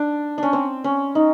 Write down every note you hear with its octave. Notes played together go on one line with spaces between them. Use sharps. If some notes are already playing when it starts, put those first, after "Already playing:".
Already playing: D4
C#4 D4
C4
C#4
D#4